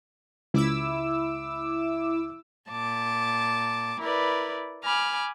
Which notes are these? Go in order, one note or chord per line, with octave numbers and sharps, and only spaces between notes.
C#2 E4 D6 E6
A#2 A5 D6
E4 A#4 B4 D5
G#5 B5 D6 F6